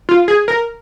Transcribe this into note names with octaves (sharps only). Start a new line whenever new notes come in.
F4
G#4
A#4